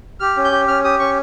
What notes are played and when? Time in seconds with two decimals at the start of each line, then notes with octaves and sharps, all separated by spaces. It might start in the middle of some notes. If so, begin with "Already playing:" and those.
0.20 G4 F6
0.37 C#4
0.44 G6
0.52 G4
0.68 C#4 F6
0.84 G4 D#6
0.99 C#4 C#6